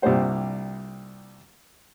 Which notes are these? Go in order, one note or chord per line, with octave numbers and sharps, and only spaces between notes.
C2 G2 A#2 G3 C5 F#5